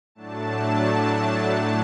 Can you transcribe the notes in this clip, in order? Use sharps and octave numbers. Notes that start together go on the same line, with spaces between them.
A2 F#3 A3 D4 A5